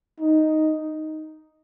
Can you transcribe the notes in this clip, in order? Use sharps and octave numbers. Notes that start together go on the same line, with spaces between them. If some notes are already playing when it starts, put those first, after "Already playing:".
D#4